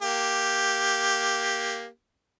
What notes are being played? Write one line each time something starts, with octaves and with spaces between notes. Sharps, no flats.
A#3 G4